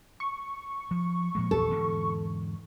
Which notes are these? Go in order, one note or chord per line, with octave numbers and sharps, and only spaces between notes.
C#6
F3
A#2 F3 G#3
A#1 E2 A4
E2 G#2 D3